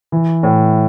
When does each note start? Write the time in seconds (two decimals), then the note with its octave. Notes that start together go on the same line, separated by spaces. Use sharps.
0.12 E3
0.43 A2